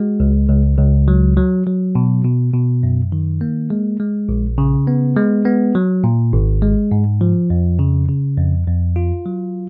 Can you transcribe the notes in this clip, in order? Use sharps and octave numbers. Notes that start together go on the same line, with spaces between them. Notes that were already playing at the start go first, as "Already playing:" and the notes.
Already playing: G#3 F#4
C#2
C#2
C#2
F#3
F#3
F#3
B2
B2
B2
F#2
D#3
A#3
G#3
G#3
A#1
C#3
B3
G#3
B3
F#3
A#2
G#1
G#3
G#2
F3
F2
C#3
C#3
F2
F2
F4
F#3